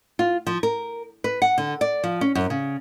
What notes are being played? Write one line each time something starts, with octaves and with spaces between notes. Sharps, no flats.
F4
F3
A#4
B4
F#5
D3
D5
F3
C#4
F#2
C#3